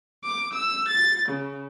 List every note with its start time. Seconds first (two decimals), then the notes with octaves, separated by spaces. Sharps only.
0.23 D6
0.54 E6
0.88 A6
1.28 C#3